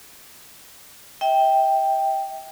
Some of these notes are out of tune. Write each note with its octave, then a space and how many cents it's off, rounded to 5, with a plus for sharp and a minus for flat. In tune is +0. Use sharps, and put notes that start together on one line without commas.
E5 -40 G5 +0